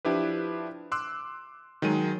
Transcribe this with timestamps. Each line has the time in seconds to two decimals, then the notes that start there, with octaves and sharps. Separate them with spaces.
0.05 F3 D4 E4 G4 B4
0.92 C6 D6 E6 F#6
1.82 D#3 F#3 G#3 D#7